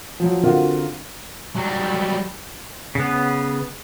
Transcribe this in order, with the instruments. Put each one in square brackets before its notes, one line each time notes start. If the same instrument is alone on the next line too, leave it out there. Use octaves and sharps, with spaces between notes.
[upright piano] F3 F#3
D3 C4 F4 F#4 A#4
[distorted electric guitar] F#3 G3
[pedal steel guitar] C#3 B3